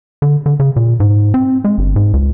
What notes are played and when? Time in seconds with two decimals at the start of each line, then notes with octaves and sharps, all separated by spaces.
0.22 D3
0.46 D3
0.60 C#3
0.76 A#2
1.00 G#2
1.34 C4
1.64 G#3
1.78 G1
1.96 G#2
2.13 C#2